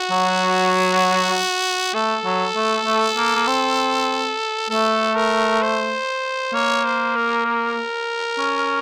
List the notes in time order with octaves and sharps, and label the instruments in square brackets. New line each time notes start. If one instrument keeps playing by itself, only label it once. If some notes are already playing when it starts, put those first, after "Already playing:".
Already playing: [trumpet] F#4
[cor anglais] F#3
[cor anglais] A3 [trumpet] A4
[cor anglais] F#3
A3
A3
A#3
A#3
C4
[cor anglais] A3 [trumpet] A4
[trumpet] A#4
C5
[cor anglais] A#3 [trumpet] C#5
[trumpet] C5
A#4
A#4
[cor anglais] C#4